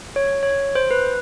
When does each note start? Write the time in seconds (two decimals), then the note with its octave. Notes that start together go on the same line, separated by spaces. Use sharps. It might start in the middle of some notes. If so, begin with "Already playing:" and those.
0.16 C#5
0.43 C#5
0.75 C5
0.91 B4